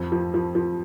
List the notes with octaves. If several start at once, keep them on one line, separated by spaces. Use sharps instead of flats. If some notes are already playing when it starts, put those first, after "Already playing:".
Already playing: F2
F3
F3
F3